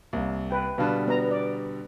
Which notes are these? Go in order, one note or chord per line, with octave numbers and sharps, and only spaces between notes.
C2 A#3
B4 G5
B2 D3 G3 B4 F5 A5
B3 A#5
D5